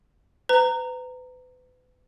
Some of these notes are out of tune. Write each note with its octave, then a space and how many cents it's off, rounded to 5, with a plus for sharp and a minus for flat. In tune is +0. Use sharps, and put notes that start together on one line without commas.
B4 +35 A#5 -15